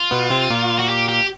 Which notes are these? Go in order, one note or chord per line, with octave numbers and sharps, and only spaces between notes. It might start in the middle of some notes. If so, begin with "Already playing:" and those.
Already playing: F4
B2 B3
C3 C4
A#2 A#3
F#4
G4
G4